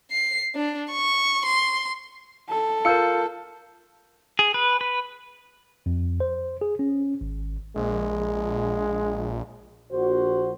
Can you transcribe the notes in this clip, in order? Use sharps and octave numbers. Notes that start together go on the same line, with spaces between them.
C7
D4
C#6
C6
A4
F4 A#4 E6 G6 C#7
G#4
B4
B4
F2
C5
G#4
C#4
G#1
A#1 G#3
A#1 F#4 C5